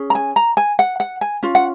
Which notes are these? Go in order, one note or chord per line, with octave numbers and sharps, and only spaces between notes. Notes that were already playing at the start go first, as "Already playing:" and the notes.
Already playing: C#4 G#4
A#5
G#5
A#5
G#5
F#5
F#5
G#5
C#4 F4
F#5